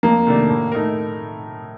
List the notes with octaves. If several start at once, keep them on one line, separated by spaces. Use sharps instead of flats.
F2 A#3
C3 D#3 A3 D4
A2
A3 D#4 A#4